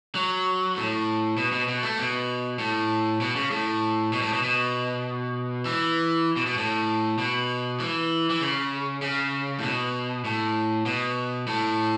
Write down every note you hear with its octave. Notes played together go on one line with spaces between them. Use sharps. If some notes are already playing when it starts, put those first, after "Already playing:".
F#3
A2
B2
B2
B2
A3
B2
A2
B2
C#3
A2
B2
A2
B2
B2
E3
B2
B2
A2
B2
E3
E3
C#3
C#3
A2
B2
A2
B2
A2